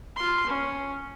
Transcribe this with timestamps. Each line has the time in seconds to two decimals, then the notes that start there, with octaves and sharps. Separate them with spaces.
0.16 F4 C6
0.46 C#4